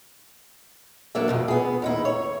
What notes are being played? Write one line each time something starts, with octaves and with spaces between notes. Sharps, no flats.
D2 F#3 A#3 D4 D5 E5
F2 B2 D#3
B3 G#4
D#2 D#4 E4
C#5